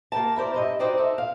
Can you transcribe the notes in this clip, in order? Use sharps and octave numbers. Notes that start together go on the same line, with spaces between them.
A#3 G4 A#4 A5
E4 A#4 C5 D5
G2 D#5 E5
D#4 F#4 C5 D5 G5 A#5
A4 E5
F5